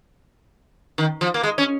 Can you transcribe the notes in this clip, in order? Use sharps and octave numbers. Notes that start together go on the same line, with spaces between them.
D#3
F3
A#3
G#3
C#4